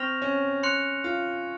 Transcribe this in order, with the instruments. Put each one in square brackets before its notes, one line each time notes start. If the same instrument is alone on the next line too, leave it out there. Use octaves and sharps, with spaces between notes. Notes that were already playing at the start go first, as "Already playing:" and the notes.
Already playing: [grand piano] C4 [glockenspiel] C#6 F6 A#6 F7
[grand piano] C#4
[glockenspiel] C6 F#6 C#7 F7
[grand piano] F4